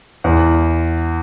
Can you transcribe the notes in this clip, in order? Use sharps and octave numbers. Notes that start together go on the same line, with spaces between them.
E2